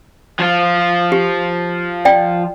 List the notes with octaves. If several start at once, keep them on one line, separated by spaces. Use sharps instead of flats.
F3 F4
G4
D5 G5